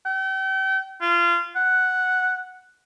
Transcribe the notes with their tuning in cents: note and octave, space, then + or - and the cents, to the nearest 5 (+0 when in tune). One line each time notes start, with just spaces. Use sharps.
G5 -40
F4 -25
F#5 +0